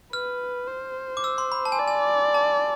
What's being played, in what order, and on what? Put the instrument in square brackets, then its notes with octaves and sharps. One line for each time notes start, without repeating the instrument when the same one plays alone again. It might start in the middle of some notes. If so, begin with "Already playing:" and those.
[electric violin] B4 [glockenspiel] F6
[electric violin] C5
[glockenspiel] D6
E6
C6
B5
A5
G#5
[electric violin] D5
[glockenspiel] G#5
A5